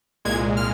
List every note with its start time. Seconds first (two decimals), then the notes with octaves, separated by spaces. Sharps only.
0.25 C2 A#2 G#3 G#6
0.57 F6